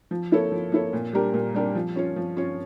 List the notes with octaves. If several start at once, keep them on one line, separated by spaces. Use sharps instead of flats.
F3
A#3 E4 A4 C#5
F3
A#3 E4 A4 C#5
A#2
G3 D4 G4 A#4
A#2
G3 D4 G4 A#4
F3
C#4 F4 C#5
F3
C#4 F4 C#5